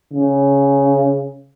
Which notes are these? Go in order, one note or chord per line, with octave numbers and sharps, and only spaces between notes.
C#3